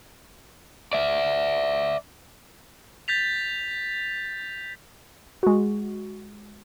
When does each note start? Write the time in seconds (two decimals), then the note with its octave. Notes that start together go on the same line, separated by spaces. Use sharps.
0.93 D5 E5
3.08 G6 A6 B6 F7
5.43 G#3 F#4